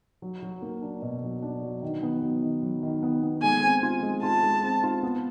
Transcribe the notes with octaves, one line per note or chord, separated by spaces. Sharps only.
F#3
F#3
A#3
D4
B2
F#3
D4
F#3
D#3
B3
F#3
D#3
F#3
D#3
B3
B3
G#3 G#5
C4
F4
G#3
F4 A5
G#3
C4
F4
B3